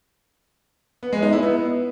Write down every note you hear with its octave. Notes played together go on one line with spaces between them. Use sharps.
B3
G#3
D#4
E4
B3